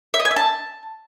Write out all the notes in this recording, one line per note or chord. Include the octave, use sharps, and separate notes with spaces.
E5
D#5
G#5
E5
A5